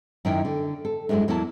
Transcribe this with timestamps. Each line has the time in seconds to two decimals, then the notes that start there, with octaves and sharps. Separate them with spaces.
0.25 F#2 D#3 E4 A#4 G5
0.45 D3
0.85 A4
1.09 F#2 G3 G#3 D4 E4
1.28 E2 F#3 A#3 E4 A5